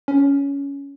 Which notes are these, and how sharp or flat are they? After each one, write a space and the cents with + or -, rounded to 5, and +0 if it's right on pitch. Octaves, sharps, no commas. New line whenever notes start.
C#4 +15